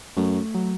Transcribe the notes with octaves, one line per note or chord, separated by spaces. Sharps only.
F#2 A3
F#3